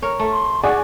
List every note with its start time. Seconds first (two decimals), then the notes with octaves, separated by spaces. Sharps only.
0.02 A#4 C#5
0.19 A3
0.33 C6
0.63 F#4 G#4 D5 F#5 G#5